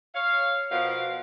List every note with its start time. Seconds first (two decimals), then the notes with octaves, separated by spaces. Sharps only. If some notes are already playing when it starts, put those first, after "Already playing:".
0.15 C#5 F5
0.71 B2 F3 A#4 F5 F#5